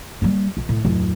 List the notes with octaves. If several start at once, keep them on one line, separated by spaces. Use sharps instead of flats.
G3 A#3
A#1
A2
D1 F2